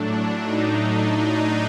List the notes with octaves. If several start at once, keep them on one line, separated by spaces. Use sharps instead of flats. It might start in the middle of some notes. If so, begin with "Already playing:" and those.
Already playing: A2 F#3 A3 D4
D#4
D#4